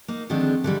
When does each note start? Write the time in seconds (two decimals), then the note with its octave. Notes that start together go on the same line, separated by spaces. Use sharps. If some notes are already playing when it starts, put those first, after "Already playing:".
0.08 A#3 D#4
0.29 D3 D#3 F3 G#3 C4 D4
0.64 D3 E3 G3